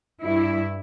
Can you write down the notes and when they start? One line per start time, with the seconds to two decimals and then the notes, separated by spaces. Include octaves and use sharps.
0.21 G2 E4